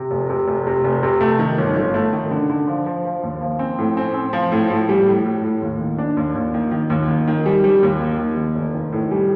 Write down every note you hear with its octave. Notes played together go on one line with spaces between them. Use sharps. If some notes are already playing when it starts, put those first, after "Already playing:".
Already playing: C3
F1
C3
F1
C3
F1
C3
A3
D#3
G1
G1
A3
D#3
D3
D3
F3
F3
F3
D#2
F3
C4
A2
C4
C4
F3
A2
A2
G3
A2
A2
A2
D#2
D#3
D4
D#2
D#2
D#3
D#3
D#2
D#3
D#3
G3
G3
D#2
D#3
D#2
D#3
F1
D#3
A2
G3